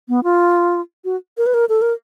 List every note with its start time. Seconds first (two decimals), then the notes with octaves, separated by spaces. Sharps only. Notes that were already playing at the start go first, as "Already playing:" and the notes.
0.09 B3
0.24 F4
1.05 F#4
1.38 A#4
1.46 B4
1.54 A#4
1.69 A4
1.82 A#4